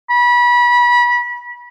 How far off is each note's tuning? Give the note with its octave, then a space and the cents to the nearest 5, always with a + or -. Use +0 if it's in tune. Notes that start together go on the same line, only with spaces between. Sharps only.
B5 -30